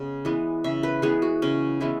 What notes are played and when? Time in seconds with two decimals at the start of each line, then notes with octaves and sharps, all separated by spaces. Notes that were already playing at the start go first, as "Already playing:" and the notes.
Already playing: C#3 G#3 B3
0.25 E3 G#3 B3
0.64 C#3 E5
0.83 B4
1.02 E3 G#3 B3 G#4
1.22 F#4
1.42 C#3 C#4
1.80 E3 G#3 B3 E4